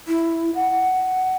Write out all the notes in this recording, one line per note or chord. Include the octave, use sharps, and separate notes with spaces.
E4
F#5